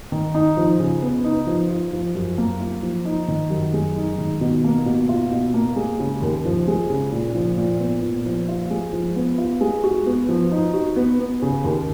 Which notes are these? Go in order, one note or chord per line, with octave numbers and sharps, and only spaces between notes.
D#3
D#4
F3
C#3
B3
D#4
F3
F4
F3
F#2
A#3
F4
F3
D#4
D#3
F#2
G#3
D#4
D#3
B2
A#3
B2
F4
B2
A#3
G#3
C#3
D#2
F3
G#3
C#3
A#2
F3
A#2
B3
A#2
F3
F4
G#3
F3
B3
F4
G#3
F#4
B3
F3
D#4
F#4
B3
B3
C#3
D#2